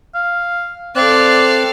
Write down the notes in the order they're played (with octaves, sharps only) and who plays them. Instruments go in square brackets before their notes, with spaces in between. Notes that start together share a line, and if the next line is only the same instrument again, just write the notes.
[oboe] F5
[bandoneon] C4 F#6 [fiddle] A4 F5 [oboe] D5